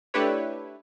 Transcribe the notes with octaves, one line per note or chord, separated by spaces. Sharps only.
A3 D4 E4 G4 B4 C#5